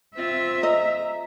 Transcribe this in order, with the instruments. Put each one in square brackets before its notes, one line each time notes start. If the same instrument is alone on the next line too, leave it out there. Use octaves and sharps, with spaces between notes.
[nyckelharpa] C4 F4 [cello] E5
[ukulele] D#5 [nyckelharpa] A#5